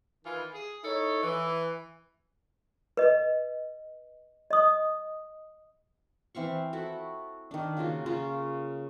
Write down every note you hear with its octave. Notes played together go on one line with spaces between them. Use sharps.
D#3 E3 F4 B4 G#5
G#4
D#4 E4 A4 C#5
E3
B4 D#5
D#5 D#6
E3 C4 F5 C#6
E4 F#4 A4
D#3 D4
C#3 A#3 F4 F#4
C#3 C#4 F4 A#4